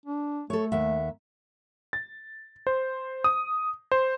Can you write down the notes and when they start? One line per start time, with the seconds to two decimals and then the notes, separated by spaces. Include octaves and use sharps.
0.06 D4
0.50 A3 A4 C#5
0.72 D#2 E5 F#5
1.93 A6
2.67 C5
3.24 D#6
3.92 C5